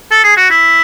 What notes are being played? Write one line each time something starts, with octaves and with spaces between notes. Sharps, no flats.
A4
G#4
F#4
E4